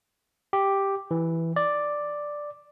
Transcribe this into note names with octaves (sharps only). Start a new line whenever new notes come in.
G4
E3
D5